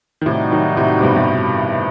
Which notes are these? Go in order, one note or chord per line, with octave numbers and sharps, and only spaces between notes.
D#3
A2 C3 G3 D#4 F#4
D#3 F#3
A2 C3
C3
G2 B2
G2